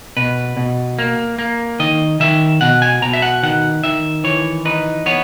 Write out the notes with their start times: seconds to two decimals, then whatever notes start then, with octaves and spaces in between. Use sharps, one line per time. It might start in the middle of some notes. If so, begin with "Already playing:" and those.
0.17 B2 B4
0.57 B2
0.99 A#3
1.39 A#3
1.80 D#3 D#5
2.20 D#3 E5
2.61 B2 F#5
2.82 G#5
3.02 B2 A#5
3.13 E5
3.22 F#5
3.43 D#3 F#5
3.84 D#3 E5
4.24 E3 C#5
4.65 D#4 B4
5.06 B3 C#5